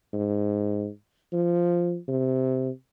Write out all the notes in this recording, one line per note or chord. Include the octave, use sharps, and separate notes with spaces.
G#2
F3
C3